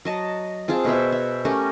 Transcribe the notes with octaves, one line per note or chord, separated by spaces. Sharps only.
F#3 D#5 A5
C4 F4 G#4 A5
B2 B4 C5 E5
E5
A3 C#4 G4 A#4